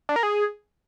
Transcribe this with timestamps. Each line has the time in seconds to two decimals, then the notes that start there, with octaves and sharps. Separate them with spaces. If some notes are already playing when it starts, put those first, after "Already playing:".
0.09 D4
0.16 A#4
0.23 G#4